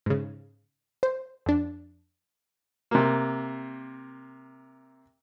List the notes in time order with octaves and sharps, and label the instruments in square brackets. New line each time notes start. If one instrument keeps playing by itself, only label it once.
[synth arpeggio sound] G#2 C#3
C5
F2 D4
[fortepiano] C3 A#3